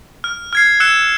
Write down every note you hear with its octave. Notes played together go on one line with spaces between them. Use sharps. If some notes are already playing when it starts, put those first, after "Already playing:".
F6
F6 G#6 C7
E6 F#6 C#7 E7